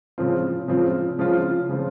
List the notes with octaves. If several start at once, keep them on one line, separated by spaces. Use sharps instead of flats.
C#3 F3 C4 F4
C#3 F3 C4 F4
C#3 F3 C4 F4
C#3 F3 C4 F4